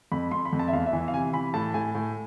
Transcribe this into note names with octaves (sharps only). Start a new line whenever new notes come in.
F2 B5
F2 C6
B5
F2
A5
E5
E2 F5
E5
E3
F5
C3 G#5
E3 B5
A2 A5
A2 G#5
A2